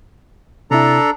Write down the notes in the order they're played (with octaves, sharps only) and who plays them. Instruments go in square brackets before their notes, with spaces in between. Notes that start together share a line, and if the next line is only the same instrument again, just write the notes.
[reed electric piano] C3 E4 [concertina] D4 A4 A#5